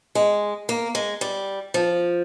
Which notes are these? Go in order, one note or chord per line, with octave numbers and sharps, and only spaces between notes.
G#3
A#3
G#3
G3
F3